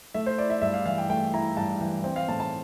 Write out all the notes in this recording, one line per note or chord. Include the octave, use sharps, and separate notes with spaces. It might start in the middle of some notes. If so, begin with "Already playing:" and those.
A3 E5
C5
E4 D5
E5
G2 E5
F5
E3 F5
G5
A3 G5
E4 A#5
G2 A5
E3
C4 G5
F5
A2 A5
A5